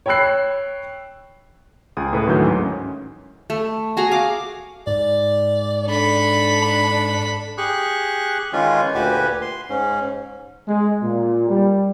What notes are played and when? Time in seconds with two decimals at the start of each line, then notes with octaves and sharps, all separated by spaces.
0.06 C#5 G5 B5 E6 F#6 C7
1.97 C#2 G#4 D#6
2.13 A2 B4
2.27 D2 A2 D#3 E3 F#3 G6
2.47 G#2
2.60 C#4
3.50 A3
3.97 F#4 G#4 F#5 A#5
4.11 F5 D6
4.87 G#2 D5
5.88 D4 A4 B5
7.58 G4 G#4 C#6 F#6
8.53 D#3 E3 G#3 C#4 F4 G#5
8.95 D2 A#2 F#4 G4 B4 G#5
9.42 C6
9.70 G#2 C#4
10.66 G#3
11.02 A#2
11.47 G3